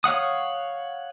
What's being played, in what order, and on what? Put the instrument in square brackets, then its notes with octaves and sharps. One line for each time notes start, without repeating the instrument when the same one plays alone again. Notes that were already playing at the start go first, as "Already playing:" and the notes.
[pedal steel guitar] C#5 F5 F#5 D#6